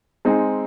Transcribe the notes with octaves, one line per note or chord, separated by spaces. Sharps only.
G#3 C4 D#4 G#4